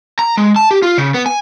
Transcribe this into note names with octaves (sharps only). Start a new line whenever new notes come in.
A#5
G#3
A5
G4
F4
C#3
B3
G#5